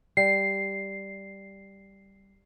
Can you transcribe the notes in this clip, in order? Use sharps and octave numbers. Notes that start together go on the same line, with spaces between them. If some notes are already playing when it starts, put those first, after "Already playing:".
G3 C7